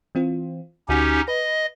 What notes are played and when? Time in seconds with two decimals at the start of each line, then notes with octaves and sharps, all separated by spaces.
0.15 E3 C4 F4
0.89 D2 C#4 D#4 F#4 G4 G#5
1.28 B4 D#5